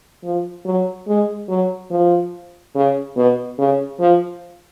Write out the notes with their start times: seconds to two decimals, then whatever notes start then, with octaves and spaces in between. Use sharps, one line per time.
0.24 F3
0.65 F#3
1.08 G#3
1.48 F#3
1.91 F3
2.75 C#3
3.16 B2
3.58 C#3
3.99 F3